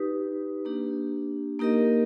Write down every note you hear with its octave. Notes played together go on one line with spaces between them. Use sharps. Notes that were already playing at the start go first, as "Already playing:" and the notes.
Already playing: D#4 G4 B4
A#3 D4 G4
A#3 D#4 G4 A#4 D#5